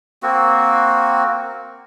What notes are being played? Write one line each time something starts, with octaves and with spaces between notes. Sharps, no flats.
A#3 C4 F#4